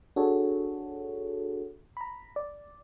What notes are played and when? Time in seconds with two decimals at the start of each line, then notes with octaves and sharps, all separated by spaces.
0.16 D4 F#4 G#4 A4 C#5
1.97 A#5 B5
2.36 D5